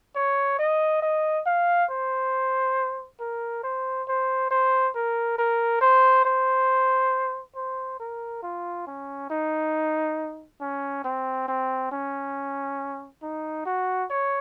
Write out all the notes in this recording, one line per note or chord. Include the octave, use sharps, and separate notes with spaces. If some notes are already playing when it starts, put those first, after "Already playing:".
C#5
D#5
D#5
F5
C5
A#4
C5
C5
C5
A#4
A#4
C5
C5
C5
A#4
F4
C#4
D#4
C#4
C4
C4
C#4
D#4
F#4
C#5